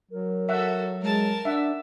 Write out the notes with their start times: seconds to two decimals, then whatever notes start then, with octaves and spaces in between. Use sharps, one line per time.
0.11 F#3 A#4
0.49 F#4 A4 E5 F#5
1.02 G#3 A#4 A5
1.45 D4 E5 F#5